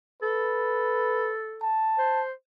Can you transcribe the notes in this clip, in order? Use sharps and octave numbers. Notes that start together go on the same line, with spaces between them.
A4 B4
A5
C5